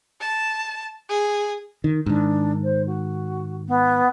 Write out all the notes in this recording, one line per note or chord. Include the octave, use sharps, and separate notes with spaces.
A5
G#4
D#3
G#2 D#3 D4
C5
F#4
B3